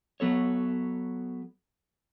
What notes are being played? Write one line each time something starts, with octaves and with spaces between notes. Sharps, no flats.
F#3 B3 A4 C#5